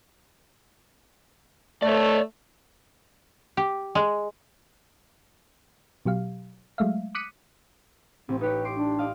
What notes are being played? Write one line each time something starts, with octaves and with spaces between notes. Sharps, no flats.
A3 C#5 D5
G4
G#3
B2 F#3 G4 F5
F#3 G#3 A3 E5 F5
D6 D#6 F#6 B6 C#7 D#7
A1 C4
D#4 G4 B4 C#5
C6 D6 C7
D4
D5 D#5 F5